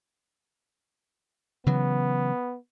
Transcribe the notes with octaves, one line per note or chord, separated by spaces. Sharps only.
C#3 E3 F#3 B3